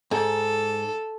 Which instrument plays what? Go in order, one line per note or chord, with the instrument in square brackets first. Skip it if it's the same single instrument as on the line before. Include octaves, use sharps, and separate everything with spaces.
[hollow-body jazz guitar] G#2 [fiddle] A4